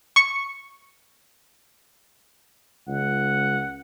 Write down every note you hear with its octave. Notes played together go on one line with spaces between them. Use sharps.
C#6 C#7
C#2 F#5